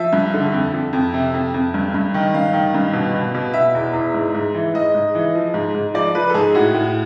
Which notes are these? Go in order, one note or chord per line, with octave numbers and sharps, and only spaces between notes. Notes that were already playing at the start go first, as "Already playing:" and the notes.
Already playing: F3 E5
G2
D3
F2
F2
F2
C3
F2
F2
G2
G2
D#3
G2 F5
D#3
G2
B2
B2
B2
B2 E5
E2
E2
G#2
G#2
E3
G#2 D#5
G#2
E3
F3
G#2
G#2
F3 D5
F3 B4
A4
G#2 G#4
A2 F#4
A2